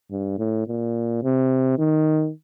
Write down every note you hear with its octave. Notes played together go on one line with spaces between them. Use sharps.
G2
A2
A#2
C3
D#3